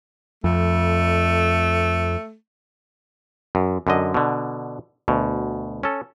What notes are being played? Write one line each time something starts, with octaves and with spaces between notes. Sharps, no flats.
F2 A3
F#2
F#2 D3 D#5
B2 D3
D2 B2
C#4 A4